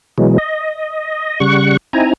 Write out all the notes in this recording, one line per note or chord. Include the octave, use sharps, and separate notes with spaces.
B2 E3 F#3 G#3
D#5
C#3 G3 F#5 C#6
C4 D#4 E4 G#5 A#5